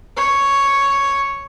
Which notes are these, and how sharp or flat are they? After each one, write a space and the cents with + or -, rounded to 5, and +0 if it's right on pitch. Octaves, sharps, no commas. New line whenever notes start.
C#5 +0